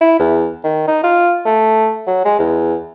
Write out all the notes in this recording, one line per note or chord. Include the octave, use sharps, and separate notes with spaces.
E4
E2
D#3
D#4
F4
A3
F#3
G#3
E2